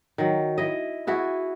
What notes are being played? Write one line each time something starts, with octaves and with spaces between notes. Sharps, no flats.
D#3 F#3
E4 D#5
B3 E4 F#4 G#4